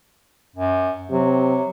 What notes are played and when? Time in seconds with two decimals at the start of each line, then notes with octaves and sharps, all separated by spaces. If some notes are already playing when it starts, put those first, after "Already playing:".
0.56 F#2
1.10 C3 F#3